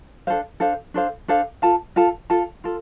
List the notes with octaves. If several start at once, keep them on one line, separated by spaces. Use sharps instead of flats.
D4 A4 C5 F5
D4 A4 C5 F5
D4 A4 C5 F5
D4 A4 C5 F5
F4 A4 F5 A5
F4 A4 F5 A5
F4 A4 F5 A5
F4 A4